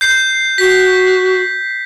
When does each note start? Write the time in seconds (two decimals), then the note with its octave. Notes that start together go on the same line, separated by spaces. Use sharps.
0.01 G6 C7
0.58 F#4 B6